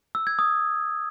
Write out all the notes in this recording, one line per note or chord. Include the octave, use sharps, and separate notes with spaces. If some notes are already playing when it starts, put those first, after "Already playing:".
E6
G#6
D#6